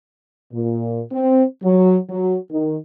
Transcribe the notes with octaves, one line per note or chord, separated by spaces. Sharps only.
A#2
C4
F#3
F#3
D#3